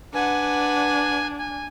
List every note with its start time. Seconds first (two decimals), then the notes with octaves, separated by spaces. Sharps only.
0.14 D4 B4 F#5 G#5
1.38 G#5